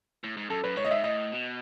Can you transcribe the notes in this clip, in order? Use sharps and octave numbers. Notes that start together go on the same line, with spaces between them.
A2
G#2
F#2 A4
F#2 B4
G#2 C#5
A2 D#5
G#2 E5
A2 D#5
B2